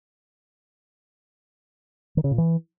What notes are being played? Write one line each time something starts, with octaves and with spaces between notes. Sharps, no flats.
D#3
C#3
A#2
E3